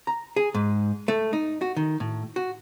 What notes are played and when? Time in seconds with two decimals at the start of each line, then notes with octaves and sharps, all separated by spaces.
0.07 A#5
0.36 G#4
0.54 G#2
1.08 A3
1.33 D#4
1.62 F#4
1.77 D#3
2.00 A2
2.36 F#4